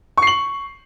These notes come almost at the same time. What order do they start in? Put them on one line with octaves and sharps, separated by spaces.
C#6 C7 F#7